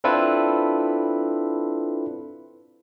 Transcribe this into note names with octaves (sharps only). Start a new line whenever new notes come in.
C4 D4 E4 F4 A4 B4